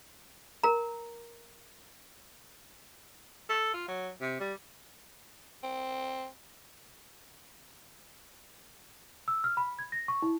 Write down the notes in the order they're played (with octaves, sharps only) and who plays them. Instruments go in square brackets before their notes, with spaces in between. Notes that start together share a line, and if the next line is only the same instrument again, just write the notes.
[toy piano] A#4 A#5
[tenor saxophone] A4
F4
F#3
C3
G3
[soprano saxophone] C4
[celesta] E6
F6
B5
G#6
A#6
C#6
E4